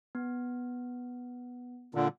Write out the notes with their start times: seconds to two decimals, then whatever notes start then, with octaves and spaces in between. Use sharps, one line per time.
0.15 B3
1.95 A#2 D3